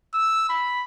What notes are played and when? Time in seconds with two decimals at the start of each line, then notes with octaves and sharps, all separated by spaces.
0.14 E6
0.49 B5